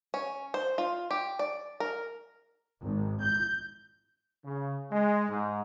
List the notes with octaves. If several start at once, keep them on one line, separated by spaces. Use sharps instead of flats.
C#4
C5
F4
G4
D5
A#4
G#1
G6
C#3
G#3
G#2